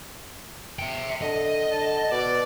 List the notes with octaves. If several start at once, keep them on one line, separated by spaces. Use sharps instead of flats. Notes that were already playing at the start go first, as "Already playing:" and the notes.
E5 G5
D3 D#5
D3 A5
B2 D5